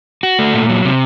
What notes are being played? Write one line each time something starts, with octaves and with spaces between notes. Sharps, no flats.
F#4
A3
A#2
F#3
C3